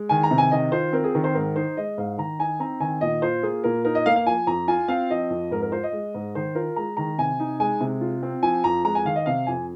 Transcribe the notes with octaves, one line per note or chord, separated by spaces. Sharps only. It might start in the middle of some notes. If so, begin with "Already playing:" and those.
Already playing: G#3
D#3 G#5
A#5
C3
G#5
D#3 D#5
F4 C5
C4 A#4
G#4
D#3 A#4
C5
G#2 A#4
D#4 C5
G#3 D#5
G#2 F5
D#3 A#5
D#4 G#5
C4 A#5
D#3 G#5
A#2 D#5
F4 C5
A#3 G#4
A#2 A#4
D#4 A#4
D#5
A#3 F5
F5
F3 G#5
F2 A#5
F4 G#5
C4 F5
F3 D#5
F2
G#2 A#4
A#4
F4 C5
D#5
G#3
G#2
D#3 C5
F4 A#4
G#3 A#5
D#3 A#5
C3 G#5
D#4
G#3 G#5
C3
F4
C4
F3 G#5
F2 A#5
G#3 A#5
G#5
D#3 F5
D#5
C3 F5
F2 G#5